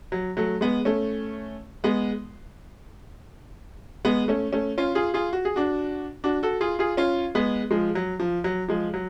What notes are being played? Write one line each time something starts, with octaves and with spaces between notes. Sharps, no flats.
F#3
F#3 A3
G#3 B3
A3 C#4
G#3 B3
G#3 B3
A3 C#4
A3 C#4
C#4 F4
F4 G#4
F4 G#4
F#4
G#4
D4 F#4
D4 F#4
F#4 A4
F4 G#4
F4 G#4
C#4 F4
G#3 B3
F3 G#3
F#3
F3
F#3
F3 G#3
F#3